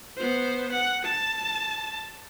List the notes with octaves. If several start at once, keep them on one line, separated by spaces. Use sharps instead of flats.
B3 C5
F#5
A5